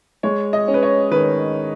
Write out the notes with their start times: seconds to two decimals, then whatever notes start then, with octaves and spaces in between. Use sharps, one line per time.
0.23 G#3 C#5
0.53 D#5
0.68 C#4
0.74 B4
0.83 C#5
1.11 D#3 B4